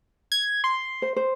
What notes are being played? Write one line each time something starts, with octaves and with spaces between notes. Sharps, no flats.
G#6
C6
C5
C5